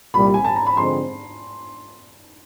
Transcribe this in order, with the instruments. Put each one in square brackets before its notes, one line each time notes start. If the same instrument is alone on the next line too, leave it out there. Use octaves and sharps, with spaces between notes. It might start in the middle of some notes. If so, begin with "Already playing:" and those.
[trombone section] C2 A#2 G3 [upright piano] B5
[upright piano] G#5
A5
A#5
B5
[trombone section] D3 F3 G#3 C4 [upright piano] C6